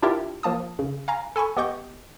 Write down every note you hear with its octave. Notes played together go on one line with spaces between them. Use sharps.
D4 E4 F4 G4 A#4 E5
F3 A#3 A5 D#6
C#3
F5 G#5 A#5
A4 G#5 B5 C#6
B3 G4 D#5 C#6 G6